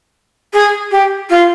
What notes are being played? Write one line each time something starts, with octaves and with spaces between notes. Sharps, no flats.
G#4
G4
F4